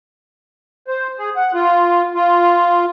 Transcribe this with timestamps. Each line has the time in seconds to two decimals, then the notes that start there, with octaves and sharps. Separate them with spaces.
0.88 C5
1.19 G#4
1.36 F#5
1.54 F4
2.15 F4